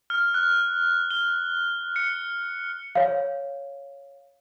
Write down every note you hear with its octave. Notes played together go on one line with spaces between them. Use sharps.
F6
F#6
G7
C#7
C#5 F5